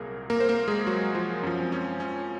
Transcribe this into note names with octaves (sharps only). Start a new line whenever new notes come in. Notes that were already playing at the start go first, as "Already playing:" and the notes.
Already playing: C2 A#2 F#3 A#3 G#4 A#4
A#3 A#4
C5
A#3 A#4
G#3 G#4
F#3 F#4
F3 F4
F#2 F3 C#4
C4
C#4
C#4